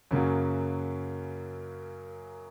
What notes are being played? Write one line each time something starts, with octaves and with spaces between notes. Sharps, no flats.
F#2 C#3 F#3 A#3